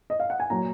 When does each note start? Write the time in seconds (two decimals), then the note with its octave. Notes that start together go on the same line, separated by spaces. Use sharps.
0.10 D#5
0.20 F5
0.30 F#5
0.40 G#5
0.50 A#2 F#3 A#5